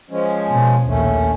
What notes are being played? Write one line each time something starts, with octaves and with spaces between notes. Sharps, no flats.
F3 G#3 C#4
B2
A#1 D#2 A3 C#4